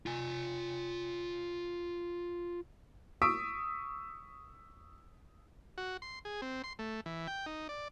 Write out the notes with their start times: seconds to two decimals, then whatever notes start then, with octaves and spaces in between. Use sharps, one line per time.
0.06 F4 G#5
3.22 C#6 D#6 E6 B6 D7
5.78 F#4
6.02 C6
6.25 G#4
6.42 C4
6.64 C6
6.79 A3
7.06 E3
7.28 G5
7.46 D#4
7.69 D5